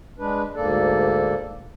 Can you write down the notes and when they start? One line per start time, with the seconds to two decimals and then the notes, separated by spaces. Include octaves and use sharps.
0.19 G#3 D4 B4
0.56 D2 G#2 A#3 A4 D5